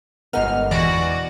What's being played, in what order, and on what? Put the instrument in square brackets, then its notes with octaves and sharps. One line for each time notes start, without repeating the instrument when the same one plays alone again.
[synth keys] G1 F6 [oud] G#3 D#4 [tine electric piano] B3 A#4 F#5
[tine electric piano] E2 B2 A#6 [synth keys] E3 D5 [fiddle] F#4